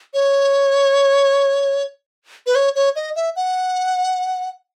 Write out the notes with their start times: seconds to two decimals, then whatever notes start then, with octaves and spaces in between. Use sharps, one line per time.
0.14 C#5
2.47 B4
2.55 C#5
2.75 C#5
2.96 D#5
3.16 E5
3.36 F#5